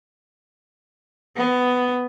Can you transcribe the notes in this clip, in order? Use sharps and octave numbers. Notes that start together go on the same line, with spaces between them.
B3